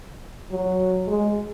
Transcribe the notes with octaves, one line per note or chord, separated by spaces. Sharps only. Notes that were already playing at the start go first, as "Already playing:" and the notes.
F#3
G#3